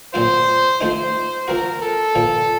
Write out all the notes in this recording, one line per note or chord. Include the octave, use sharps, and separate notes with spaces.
A#2 F#3 C4 F4 C5
F3 A3 C4 D#4 C5
F3 C4 F#4 A#4
A4
A#2 F3 A#3